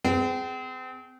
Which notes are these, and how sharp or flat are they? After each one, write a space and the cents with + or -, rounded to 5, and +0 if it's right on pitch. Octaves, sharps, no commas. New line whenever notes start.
C4 -40 G#4 +0